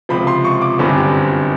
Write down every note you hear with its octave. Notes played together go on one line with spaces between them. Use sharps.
C#2 C3 F3 B5
C6
C#6
D6
G1 F#2 D3 G3 C4